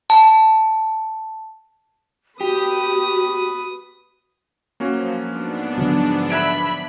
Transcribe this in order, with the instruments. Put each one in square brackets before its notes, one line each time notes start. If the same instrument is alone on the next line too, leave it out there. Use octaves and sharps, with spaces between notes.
[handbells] A5
[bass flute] F#4 [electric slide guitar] G4 [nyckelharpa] B4 D#6
[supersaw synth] F3 F#3 [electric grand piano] A#3 C#4 F#4
[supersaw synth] G#2 B3 D4
[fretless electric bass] D3 F3 F#3
[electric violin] E5 B5 [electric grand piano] F#6 G#6 D7